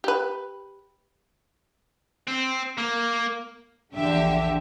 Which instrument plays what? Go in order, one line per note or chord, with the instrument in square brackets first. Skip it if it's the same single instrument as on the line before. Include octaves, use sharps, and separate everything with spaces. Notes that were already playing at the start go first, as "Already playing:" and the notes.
[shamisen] G4 B4
[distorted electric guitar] C4
A#3
[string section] A#1 E2 D3 G4 E5